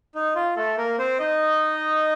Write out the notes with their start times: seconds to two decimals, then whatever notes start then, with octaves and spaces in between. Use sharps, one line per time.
0.15 D#4
0.36 F4
0.56 A3 A4
0.77 A#3 A#4
0.99 C4 C5
1.19 D#4 D#5